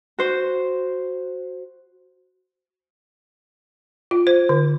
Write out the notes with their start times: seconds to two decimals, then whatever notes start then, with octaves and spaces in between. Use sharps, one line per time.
0.18 F#4 C5
4.11 F4
4.27 C5
4.49 D3